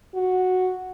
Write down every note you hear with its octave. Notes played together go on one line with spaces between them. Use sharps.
F#4